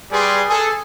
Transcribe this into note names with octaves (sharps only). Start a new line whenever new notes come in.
G3 G#4 B4 D5 C6
G#4 A4